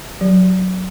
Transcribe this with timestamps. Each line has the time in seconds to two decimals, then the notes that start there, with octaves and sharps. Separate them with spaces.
0.21 F#3